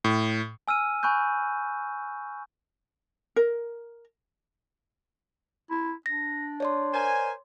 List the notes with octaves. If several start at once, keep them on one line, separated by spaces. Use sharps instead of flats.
A2
G#5 E6 F6 D#7
G#5 B5 C#6 F#6 G6
A#4
E4
D4 A#6
C#5 D5 C6
A#4 C5 G#5